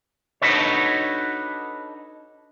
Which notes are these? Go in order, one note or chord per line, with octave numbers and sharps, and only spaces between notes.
D4 D#4 F#4 A4 B4 C#5